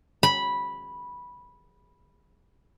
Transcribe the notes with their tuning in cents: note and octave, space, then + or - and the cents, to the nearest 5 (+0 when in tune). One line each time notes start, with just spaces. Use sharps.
B5 -10